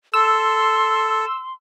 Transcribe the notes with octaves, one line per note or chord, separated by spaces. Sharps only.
A4 C6 E6